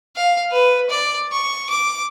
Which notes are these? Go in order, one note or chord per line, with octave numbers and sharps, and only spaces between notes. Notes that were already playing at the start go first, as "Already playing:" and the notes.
F5
B4
D5
C#6
D6